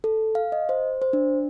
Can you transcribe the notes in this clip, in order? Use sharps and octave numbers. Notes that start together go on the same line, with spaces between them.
A4
F5
D#5
C5
C5
D4